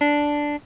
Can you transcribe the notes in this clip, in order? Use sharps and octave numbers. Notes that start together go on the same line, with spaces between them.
D4